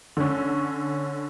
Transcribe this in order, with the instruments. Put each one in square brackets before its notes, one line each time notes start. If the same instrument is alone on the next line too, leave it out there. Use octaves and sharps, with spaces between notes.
[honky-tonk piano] D3 C#4